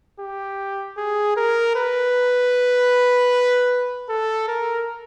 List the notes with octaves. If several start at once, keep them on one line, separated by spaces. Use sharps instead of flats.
G4
G#4
A#4
B4
A4
A#4